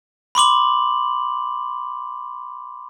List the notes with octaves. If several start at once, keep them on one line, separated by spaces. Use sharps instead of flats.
B5 C6 D6 F#7